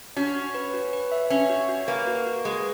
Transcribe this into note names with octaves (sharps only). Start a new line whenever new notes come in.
C#4 F#4
F#4
B4
F#4
B4
E5
C#4 E5
F#4
F#4
A#3 B4
F#4
F#4
G#3 B4